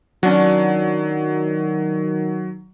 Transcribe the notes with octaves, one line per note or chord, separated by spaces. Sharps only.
D#3 F#3 C#4 D4 F#4